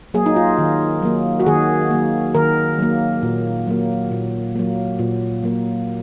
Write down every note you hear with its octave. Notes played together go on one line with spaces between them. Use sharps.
F#3 A#3 G#4
D#4
F4
D#3
F#3 A#3
F#4
D#3 G#4
F#3 A#3
D#3 A#4
F#3 A#3
A#2
F#3 A#3
A#2
F#3 A#3
A#2
F#3 A#3